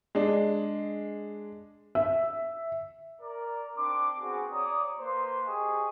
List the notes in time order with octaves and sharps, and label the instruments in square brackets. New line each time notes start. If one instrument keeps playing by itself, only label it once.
[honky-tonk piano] G#3 D4
[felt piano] E5
[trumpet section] A#4 D5
C4 D4 C6 D6
B3 C4 F#4 G#4
C#5 D5 A#5 D#6
A#3 B4 C5 C6
G4 G#4 D#5 G#5 C#6 D#6